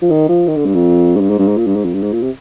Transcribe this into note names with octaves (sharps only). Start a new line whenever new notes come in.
F3
D#3
F3
D#3
D3
G2
F2
G#2
G2
G#2
G2
G#2
A#2
G2
G#2
F2
G2
G#2
A#2
C3